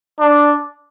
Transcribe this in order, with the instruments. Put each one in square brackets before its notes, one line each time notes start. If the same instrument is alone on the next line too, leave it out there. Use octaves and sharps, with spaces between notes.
[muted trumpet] D4